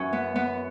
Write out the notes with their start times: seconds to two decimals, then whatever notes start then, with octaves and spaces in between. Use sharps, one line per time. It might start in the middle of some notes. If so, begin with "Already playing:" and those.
Already playing: F#2 E3 C#4
0.13 B3
0.36 B3